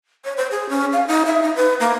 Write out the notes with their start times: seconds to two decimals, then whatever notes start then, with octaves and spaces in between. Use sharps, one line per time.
0.25 C#5
0.37 C5
0.51 G#4
0.69 C#4
0.93 F5
1.07 D#4
1.26 E5
1.42 D#4
1.56 B4
1.80 A#3